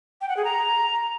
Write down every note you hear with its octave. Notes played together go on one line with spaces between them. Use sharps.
G5
F#5
G#4
A#5